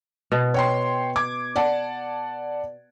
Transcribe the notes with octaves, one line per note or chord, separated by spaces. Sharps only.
B2
C#5 G5 C6
D6 G#6
D5 F#5 A5